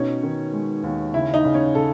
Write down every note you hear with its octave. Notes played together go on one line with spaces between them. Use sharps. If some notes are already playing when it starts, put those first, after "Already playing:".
Already playing: B2 C#4 D#4
D#3
G#3
D#2
C#3 E4
D#4
C#3
C#4
C#3 A4